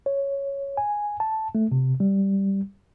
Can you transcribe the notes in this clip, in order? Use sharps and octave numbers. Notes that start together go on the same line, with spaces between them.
C#5
G#5
A5
A3
C3
G3